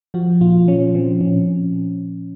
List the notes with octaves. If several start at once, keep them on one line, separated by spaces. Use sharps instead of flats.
F3 F#4
A#2 F4
F3 C#4
F3 C4
A#2 C#4